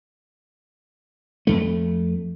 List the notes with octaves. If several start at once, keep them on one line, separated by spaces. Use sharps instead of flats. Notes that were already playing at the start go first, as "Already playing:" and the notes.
F2 A3